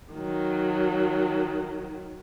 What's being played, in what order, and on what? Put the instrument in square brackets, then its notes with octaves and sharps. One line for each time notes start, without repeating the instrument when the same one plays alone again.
[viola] D#3 F#3